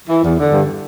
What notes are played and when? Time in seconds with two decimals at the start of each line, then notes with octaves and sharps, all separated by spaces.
0.08 E3
0.23 E2
0.38 D3
0.52 G2